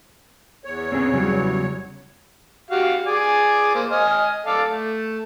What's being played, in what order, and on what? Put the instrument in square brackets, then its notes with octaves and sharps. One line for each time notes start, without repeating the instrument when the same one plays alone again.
[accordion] E2 C#5
[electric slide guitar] C4 C#4 G#4
C#3 F#3 G3
[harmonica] F#4 G4 F5
G#4 D5 G#5
A#3 C5
D#5 G#5 F6
A4 D5 F5
A3